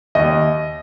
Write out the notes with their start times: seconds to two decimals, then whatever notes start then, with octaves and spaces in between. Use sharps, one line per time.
0.15 D#2 D#5